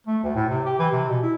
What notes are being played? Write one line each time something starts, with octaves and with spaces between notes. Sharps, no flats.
A3
D2
A2
C3
G4
E3
C3
B2
E4